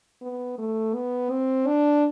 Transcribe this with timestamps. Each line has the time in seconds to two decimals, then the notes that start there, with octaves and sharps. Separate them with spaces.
0.22 B3
0.58 A3
0.95 B3
1.30 C4
1.67 D4